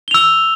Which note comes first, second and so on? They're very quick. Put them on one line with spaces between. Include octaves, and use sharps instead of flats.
G7 F7 E6